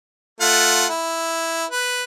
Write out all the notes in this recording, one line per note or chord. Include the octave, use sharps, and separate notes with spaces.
A3 F4 F#5
E4
B4